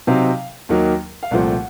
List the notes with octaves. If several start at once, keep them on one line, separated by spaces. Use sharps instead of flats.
C3 F#3 C4 D#4 F5
D#2 D#3 F#3 A#3 D#4
F5
C2 A#2 F3 A3 C4 F#5